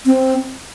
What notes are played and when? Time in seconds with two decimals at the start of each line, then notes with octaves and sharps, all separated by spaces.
0.06 C4